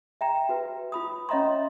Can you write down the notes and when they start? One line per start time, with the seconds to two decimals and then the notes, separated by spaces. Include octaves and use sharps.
0.21 E5 G5 A#5
0.49 F#4 B4
0.92 F4 B5 D#6
1.29 C#4 C#5 D#5 E5 A#5 C6